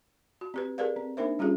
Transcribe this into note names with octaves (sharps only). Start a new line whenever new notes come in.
F#4
C4 G4 B4
G4 G#4 A#4 B4 D5 F5
C4
A#3 D4 D#4 A#4 C5 E5
G3 C#4 F4 G4 G#4